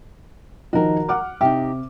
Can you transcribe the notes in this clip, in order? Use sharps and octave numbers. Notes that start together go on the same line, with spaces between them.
D#3 F3 D#4 F#4 A#4
F#5 D6 F6
C3 D#4 G4 E5